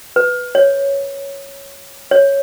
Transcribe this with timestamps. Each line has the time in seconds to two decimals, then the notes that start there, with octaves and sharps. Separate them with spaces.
0.16 B4
0.55 C#5
2.11 C#5